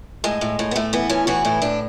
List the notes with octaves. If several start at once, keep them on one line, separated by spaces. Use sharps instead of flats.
A2 G#3
A2
A2
B3
A2 A3
E3 B3
A2 C#4
E3 F#4
A2 E4
A2 D4